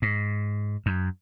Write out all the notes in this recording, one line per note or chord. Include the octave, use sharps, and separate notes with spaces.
G#2
F#2